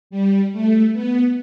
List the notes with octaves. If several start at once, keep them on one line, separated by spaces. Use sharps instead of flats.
G3
A3
B3